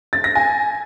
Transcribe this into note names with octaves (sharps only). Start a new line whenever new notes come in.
A6
A#6
G#5